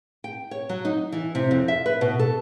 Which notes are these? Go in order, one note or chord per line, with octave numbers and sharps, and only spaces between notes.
G5
C#5
F#3
D#4
E3
C3
F2
E5
B4
B2
A4